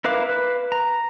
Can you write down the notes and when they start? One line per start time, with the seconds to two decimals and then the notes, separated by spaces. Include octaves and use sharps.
0.04 E4 A#4 B4 F5 D6
0.29 B4
0.72 A#5